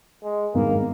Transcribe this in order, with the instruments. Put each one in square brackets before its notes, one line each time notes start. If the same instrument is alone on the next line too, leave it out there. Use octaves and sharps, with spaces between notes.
[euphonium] G#3
[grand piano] G#1 G2 D#3 G#3 B3 [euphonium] A#3